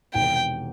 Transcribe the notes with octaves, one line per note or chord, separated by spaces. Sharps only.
E1 E2 C3 D#3 G5